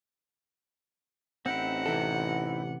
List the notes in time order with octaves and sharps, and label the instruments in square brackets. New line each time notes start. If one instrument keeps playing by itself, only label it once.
[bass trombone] A1 [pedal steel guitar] C4 D#4 E4 [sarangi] F#5
[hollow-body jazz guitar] C3 E3 A4